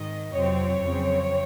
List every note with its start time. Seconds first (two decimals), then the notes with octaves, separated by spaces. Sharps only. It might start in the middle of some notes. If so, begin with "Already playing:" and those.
Already playing: G#1 G#2 D#3 D#5
0.34 F2 C3 F#3 C4 C#5
0.85 F2 C#3 F#3 C4